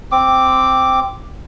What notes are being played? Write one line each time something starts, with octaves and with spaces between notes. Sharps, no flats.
C4 D6